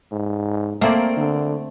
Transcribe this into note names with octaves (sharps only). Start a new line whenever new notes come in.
G#2
A3 A#3 C4 D5
D3